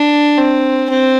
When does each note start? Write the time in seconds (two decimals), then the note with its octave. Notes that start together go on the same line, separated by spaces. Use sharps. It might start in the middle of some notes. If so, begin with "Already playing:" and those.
Already playing: D4
0.38 C4
0.90 C4